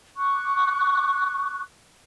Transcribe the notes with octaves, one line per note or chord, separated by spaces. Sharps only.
C#6 D6 F#6